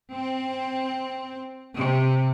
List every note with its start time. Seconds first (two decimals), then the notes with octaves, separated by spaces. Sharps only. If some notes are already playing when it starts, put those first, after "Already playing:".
0.14 C4
1.77 C3